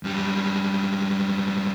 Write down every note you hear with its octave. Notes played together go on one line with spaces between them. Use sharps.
F#2 G3